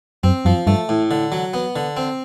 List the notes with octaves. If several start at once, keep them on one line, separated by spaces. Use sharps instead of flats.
F#2 C4
F#2 F3
G2 A3
A2
D3
F#3
B3
D3
C4